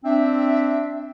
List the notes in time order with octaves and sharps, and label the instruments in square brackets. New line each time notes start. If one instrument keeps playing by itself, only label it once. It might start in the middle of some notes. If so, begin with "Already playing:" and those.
[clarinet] C4 [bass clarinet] D4 [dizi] E5